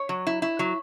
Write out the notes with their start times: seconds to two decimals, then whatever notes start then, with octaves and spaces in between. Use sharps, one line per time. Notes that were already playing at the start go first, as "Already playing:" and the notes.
Already playing: C#5
0.09 F#3
0.27 E4
0.42 E4
0.59 F#3